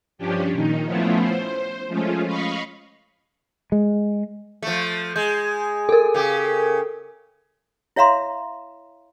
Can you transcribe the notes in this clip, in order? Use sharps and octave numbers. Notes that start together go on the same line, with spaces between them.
G2 F3 C#4 D4 G4
A#2 D#3 D#4
F3 A3 B3 C#4 E4 F4
C5
F3 G#3 A3 C#4 F4
D#5 F5 B5 C#6
G#3
F3 A3
G#3 G6
A4 A#4
C#3 G4
E4 C#5 E5 F5 A#5 C6